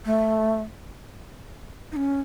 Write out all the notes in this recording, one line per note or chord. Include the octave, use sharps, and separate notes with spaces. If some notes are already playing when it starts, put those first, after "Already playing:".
A3
D#4
C#4